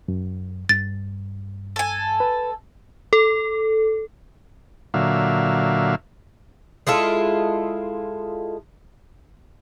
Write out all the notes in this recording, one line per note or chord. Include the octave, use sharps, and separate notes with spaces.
F#2
G2 A6
A4 G#5
B4
A4
A#2 D3 F#3 E5 F5
G#3 E4 F4 A4